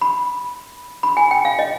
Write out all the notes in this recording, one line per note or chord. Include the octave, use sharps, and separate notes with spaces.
B5
B5
G#5
G5
F5
D#5